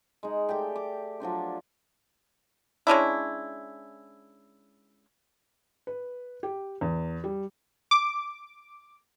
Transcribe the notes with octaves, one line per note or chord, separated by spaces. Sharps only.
G#3 D#4
A3 G4 D5 G5
D6
F3 F#3 D4 C5
G#3 C#4 D4 E4
B4
G4
E2
G3
D6